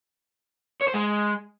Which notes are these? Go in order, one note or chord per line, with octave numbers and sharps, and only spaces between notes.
C#5
C5
G#3